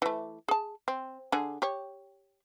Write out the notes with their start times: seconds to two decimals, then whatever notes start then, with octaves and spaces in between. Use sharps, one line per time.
0.02 E3 A3
0.48 G#4 A5
0.88 C4
1.32 D3 G#4
1.62 G4 C#5